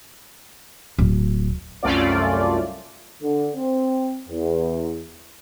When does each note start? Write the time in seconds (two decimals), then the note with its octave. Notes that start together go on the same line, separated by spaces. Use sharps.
0.99 D1
1.83 C2 F#2 A3 C#4 F4 D5
3.22 D3
3.55 C4
4.29 E2